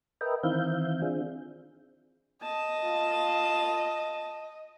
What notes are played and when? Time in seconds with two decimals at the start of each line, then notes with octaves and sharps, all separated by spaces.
0.21 A#4 B4 D#5 E5 G5
0.43 D#3 E3 C4 E5 F5 G6
1.02 C4 D4 F4 G#4
2.43 D#5 A5
2.84 F4